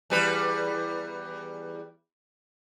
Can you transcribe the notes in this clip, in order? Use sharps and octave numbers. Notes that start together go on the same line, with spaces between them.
E2 G3 B4